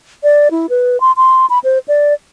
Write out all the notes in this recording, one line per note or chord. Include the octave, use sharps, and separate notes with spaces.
D5
E4
B4
C6
C6
B5
C5
D5